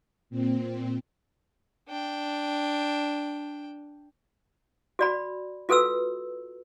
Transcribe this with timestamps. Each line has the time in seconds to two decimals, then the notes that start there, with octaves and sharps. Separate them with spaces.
0.30 A#2 C4
1.89 D4 G5
4.99 F#4 D5 B5
5.69 F4 F#4 A4 B4 E6